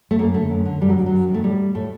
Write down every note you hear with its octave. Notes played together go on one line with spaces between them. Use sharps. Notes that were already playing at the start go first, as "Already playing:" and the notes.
A3
F#2 A#3
D3 A3
F#2
D3
F#2 G3
F#3
D#3
F#3
F#2
D#3
A3
A2 G3
A2 A3